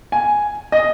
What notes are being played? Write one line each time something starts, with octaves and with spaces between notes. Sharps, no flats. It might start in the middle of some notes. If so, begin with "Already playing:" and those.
G#5
D#5